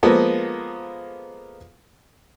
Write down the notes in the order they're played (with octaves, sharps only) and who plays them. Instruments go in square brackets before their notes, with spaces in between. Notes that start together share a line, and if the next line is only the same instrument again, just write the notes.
[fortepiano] F3 G#3 A#3 B3 A4